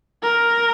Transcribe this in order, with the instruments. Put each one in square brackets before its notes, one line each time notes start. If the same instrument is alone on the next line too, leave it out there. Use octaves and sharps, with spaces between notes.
[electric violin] A#4